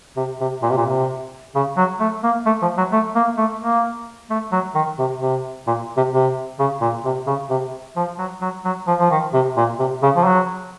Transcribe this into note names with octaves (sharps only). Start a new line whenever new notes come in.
C3
C3
A#2
C3
A#2
C3
C#3
F#3
A3
A#3
A3
F3
F#3
A3
A#3
A3
A#3
A3
F#3
D#3
C3
C3
A#2
C3
C3
C#3
A#2
C3
C#3
C3
F3
F#3
F#3
F#3
F3
F3
D#3
C3
A#2
C3
C#3
F3
F#3